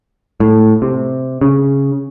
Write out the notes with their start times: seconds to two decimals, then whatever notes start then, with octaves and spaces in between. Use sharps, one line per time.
0.40 A2
0.82 C3
1.41 C#3